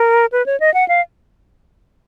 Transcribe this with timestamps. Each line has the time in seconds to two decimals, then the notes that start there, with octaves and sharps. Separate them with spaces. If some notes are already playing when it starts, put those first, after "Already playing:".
Already playing: A#4
0.32 B4
0.46 C#5
0.60 D#5
0.74 F#5
0.88 F5